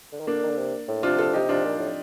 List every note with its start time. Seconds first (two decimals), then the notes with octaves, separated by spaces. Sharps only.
0.12 D3
0.20 D#3
0.27 D3 A#3 D4
0.43 D#3
0.50 D3
0.58 C3
0.88 A2
1.03 C3 D4 F4
1.18 F4 A4
1.33 C3 D#4 G4
1.49 C3 D4 F4
1.64 A#2
1.79 A2